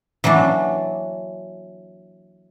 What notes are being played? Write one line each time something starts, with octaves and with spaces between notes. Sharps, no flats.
E3 F#3 A#3 D4